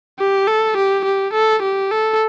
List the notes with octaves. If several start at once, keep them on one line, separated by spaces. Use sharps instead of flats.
G4
A4
G4
G4
A4
G4
A4